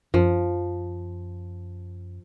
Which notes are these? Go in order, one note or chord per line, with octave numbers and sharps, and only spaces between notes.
F#2 F3